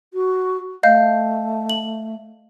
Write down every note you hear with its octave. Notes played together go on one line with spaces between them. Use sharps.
F#4
A3 D#5 F5 G6
F#7